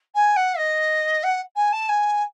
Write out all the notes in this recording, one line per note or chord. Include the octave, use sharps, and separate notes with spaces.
G#5
F#5
D#5
F#5
G#5
A5
G#5